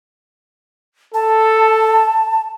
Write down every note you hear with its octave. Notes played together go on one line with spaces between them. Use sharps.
A4 A5